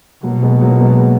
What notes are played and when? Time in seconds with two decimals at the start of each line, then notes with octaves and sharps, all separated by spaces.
0.23 B2 F#3 A#3
0.43 G#3 B3
0.61 F#3 A#3
0.72 A#3
0.80 G#3 B3